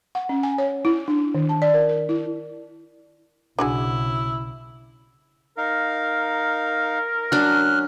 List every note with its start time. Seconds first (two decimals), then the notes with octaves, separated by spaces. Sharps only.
0.15 F#5
0.29 C#4
0.43 G#5
0.58 C#5
0.85 E4
1.08 D4
1.35 D#3
1.49 A5
1.62 D5
1.74 A#4
1.89 A#4
2.09 E4
3.59 B1 C#3 D4 E4 F#4 G#4
5.58 D#4 A#4 F5
7.32 F#3 C#4 D4 F6 F#6